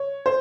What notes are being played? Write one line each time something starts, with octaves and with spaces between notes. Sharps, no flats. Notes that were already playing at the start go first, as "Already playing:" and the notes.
Already playing: C#5
C5